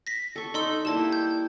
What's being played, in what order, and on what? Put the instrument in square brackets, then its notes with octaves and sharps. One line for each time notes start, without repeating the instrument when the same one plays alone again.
[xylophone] A#6 B6
[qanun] A4 C#6
[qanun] D#4 [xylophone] A4 C6 E6
[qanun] G3 A#3 E4 [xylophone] A5 E7
[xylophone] G6